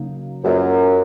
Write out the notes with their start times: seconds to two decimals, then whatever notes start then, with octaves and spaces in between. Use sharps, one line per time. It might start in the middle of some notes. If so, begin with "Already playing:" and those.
Already playing: C#3 F#3 A#3 D#4
0.44 F#2 A#3 F4 G#4 B4 D#5